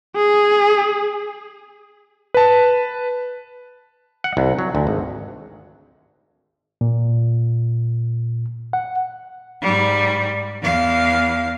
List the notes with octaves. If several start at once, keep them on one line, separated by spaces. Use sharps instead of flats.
G#4
B4 A5
F#5
C2
F#3
D2
G#1
A#2
F#5
G#2 G3
E2 F5